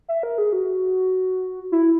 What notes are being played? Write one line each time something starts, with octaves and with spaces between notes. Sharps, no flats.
E5
A#4
G#4
F#4
E4